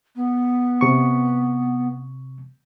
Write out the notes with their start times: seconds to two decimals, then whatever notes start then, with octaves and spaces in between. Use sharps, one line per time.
0.16 B3
0.81 C3 C#6